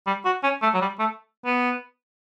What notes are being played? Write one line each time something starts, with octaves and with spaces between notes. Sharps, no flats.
G3
F#4
C#4
A3
F#3
G3
A3
B3